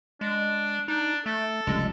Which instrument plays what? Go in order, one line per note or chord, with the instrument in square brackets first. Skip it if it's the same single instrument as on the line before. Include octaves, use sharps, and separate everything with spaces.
[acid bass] G#3 [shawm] D4
[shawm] D4 [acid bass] D#4
[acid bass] A3 [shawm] A4
[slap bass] F1 C#2 G3 [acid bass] G#3